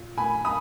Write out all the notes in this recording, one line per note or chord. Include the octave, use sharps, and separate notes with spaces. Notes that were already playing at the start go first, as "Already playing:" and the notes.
Already playing: A#2
G#5 B5
B5 D#6